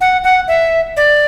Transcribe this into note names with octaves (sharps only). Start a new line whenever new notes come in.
F#5
F#5
E5
D5